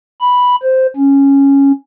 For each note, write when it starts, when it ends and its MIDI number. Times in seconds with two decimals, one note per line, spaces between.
0.21 0.56 83
0.62 0.86 72
0.96 1.72 61